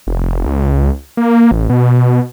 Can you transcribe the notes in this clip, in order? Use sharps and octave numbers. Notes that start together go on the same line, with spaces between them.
F1
C#2
A#3
A1
B2